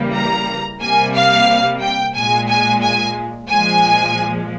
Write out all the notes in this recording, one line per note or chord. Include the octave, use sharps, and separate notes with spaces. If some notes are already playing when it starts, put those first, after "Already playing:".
Already playing: C#3 E3 G3 A#3
A#5
C3 G3 A#3 G#5
F5
G5
A#2 G#3 G#5
G#5
G#5
A#2 F3 G#3 G#5